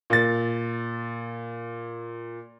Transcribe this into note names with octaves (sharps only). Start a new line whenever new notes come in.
A#2 A6